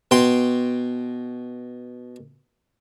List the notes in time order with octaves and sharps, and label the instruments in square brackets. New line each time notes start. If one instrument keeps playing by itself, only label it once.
[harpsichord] B2 G5 C6